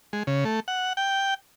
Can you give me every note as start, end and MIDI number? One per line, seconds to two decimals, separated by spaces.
0.13 0.23 56
0.27 0.44 49
0.45 0.60 57
0.68 0.93 78
0.97 1.34 79